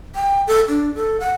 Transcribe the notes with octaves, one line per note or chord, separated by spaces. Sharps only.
G5
A4
D4
A4
F#5